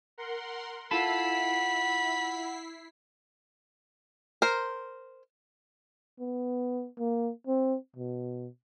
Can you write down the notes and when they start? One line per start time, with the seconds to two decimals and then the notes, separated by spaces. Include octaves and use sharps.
0.18 A#4 F#5 C6
0.91 E4 F4 A4 F#5 B5 B6 C7
4.42 A#4 C5
6.20 B3
6.99 A#3
7.47 C4
7.96 B2